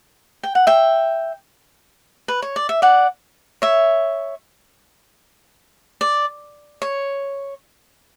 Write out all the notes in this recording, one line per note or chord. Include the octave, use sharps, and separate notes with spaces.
G5
F#5
E5 G5
B4
C#5
D5
E5
D5 F#5
C#5 E5
D5
C#5